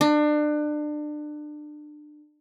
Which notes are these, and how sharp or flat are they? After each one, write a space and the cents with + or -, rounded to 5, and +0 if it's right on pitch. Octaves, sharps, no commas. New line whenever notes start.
D4 +30